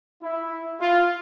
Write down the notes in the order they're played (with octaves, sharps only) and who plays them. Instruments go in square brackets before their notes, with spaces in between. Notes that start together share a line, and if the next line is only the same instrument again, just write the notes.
[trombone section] E4
F4